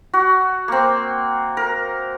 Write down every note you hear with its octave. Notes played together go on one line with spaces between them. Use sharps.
F#4
A#3 C4
A#4